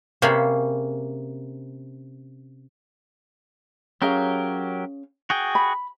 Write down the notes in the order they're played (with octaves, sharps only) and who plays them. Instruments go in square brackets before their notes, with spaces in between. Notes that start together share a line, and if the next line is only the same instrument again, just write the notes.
[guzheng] C3 A#3 C#4 G#4 B5
[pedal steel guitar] F#3 G4 A#4 [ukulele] C#4 G#4 F5
[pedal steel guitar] F#4 G#4 G5
[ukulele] B5